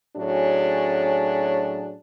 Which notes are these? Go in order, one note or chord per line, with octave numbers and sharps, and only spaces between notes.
A2 F#3 C#4 D4 F#4 G#4